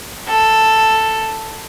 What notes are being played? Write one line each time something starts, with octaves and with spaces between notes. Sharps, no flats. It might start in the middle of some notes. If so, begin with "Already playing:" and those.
A4